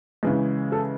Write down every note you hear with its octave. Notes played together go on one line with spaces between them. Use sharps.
C#3 E3 G#3
A4